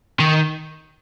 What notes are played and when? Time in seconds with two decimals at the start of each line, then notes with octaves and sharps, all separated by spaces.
0.20 D#3